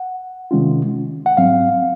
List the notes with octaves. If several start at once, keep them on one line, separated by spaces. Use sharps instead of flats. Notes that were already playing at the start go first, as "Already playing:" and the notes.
Already playing: F#5
C3 D#3 G#3 C#4 F4
F#5
G#2 F#3 C4 F5